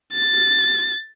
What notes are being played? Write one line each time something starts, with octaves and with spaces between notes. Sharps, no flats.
A6